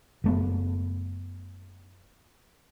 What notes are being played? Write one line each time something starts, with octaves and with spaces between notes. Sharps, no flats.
F#1 A3 B3